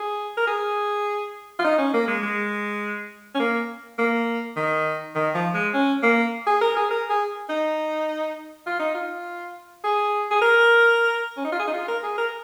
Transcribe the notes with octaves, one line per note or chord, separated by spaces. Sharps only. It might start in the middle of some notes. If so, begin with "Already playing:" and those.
Already playing: G#4
A#4
G#4
F4
D#4
C#4
A#3
G#3
G#3
C#4
A#3
A#3
D#3
D#3
F3
G#3
C#4
A#3
G#4
A#4
G#4
A#4
G#4
D#4
F4
D#4
F4
G#4
G#4
A#4
C#4
D#4
F4
G#4
D#4
F4
A#4
G#4
A#4